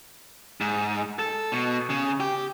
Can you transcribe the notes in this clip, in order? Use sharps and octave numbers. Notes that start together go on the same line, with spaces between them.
G#2
A4
B2
C#3
G4